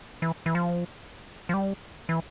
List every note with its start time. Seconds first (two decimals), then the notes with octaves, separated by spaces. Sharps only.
0.22 E3
0.46 E3
0.55 F3
1.49 F3
1.54 G3
2.09 E3